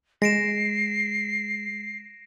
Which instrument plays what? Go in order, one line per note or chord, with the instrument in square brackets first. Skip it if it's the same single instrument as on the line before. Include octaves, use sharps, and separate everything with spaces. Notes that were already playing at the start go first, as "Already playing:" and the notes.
[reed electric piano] G#3 [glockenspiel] A#6 D7 E7 [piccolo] C7